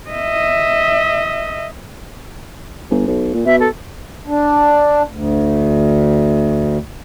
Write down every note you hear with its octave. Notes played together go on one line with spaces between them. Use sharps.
D#5 E5
G1
B1
A#2
B2 E5
A4
D4
D2